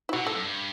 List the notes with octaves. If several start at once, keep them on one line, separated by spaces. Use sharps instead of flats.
E4
B2 F#4
A2 A4
F#2
G2